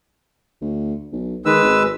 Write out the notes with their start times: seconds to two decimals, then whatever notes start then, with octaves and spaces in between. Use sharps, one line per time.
0.62 D2
1.12 B1
1.46 D#3 G#3 B4 E6
1.64 G#1